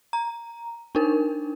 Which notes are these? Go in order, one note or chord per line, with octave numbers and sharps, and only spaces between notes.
A#5
D4 D#4 A#4